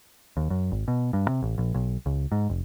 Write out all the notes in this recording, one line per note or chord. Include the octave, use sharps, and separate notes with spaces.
D#2
F#2
G#1
B2
G2
C3
A1
A#1
B1
C#2
G#2
F1